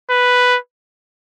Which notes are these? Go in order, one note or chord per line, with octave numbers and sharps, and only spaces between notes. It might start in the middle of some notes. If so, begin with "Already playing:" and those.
B4